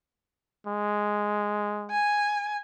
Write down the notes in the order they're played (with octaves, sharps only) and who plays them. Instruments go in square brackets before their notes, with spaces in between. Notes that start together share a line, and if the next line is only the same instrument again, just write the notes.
[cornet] G#3
[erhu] G#5